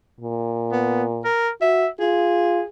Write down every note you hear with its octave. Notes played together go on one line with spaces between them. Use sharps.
A#2
B3
A#4
F#4 E5
F4 G#4